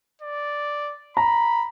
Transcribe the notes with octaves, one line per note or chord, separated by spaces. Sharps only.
D5
A#5 B5